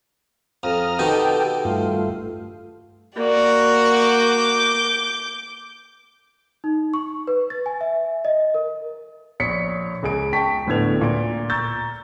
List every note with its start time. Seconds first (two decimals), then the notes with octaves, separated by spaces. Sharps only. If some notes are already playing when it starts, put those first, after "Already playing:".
0.63 F2 A#5 D#6 F6
0.99 B2 D#3 D#4 G4 A4 G5
1.65 G2 A3 F4
3.16 A#3 F#4 D5
3.93 D6 G6
6.64 D#4
6.94 C#6
7.27 B4
7.50 A6
7.66 G#5
7.81 E5
8.25 D#5
8.54 A#4
9.40 A#1 C#5 B6 C#7
10.03 C#2 G#4 D7
10.33 G5 A5 C#6 B6 D7
10.66 D1 A2 D3 B3 G#6 F7
11.01 A#2 D7
11.49 A#5 C#6 E6 G6 A6